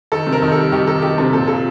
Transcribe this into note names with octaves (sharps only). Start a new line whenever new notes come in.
D#3 A4
C3
A#4
D#3
G3 A4
D#3 G4
D#3 A4
D#3 G4
C3 A4
A#2 A4
A#2 A4